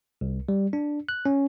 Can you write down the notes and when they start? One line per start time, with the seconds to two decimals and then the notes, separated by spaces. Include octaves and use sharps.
0.21 C2
0.49 G3
0.73 D4
1.09 F#6
1.26 C#4